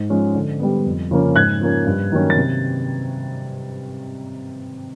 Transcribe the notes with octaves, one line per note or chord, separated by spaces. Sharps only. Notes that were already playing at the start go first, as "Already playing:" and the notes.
Already playing: G#2
F3 G#3 C#4
D3
G3 B3
F2
C#3 F3 A#3 C#4
G#2 F#6 G#6
F3 A#3 C#4
G2
D#3 F#3 A#3 C#4
A6
C3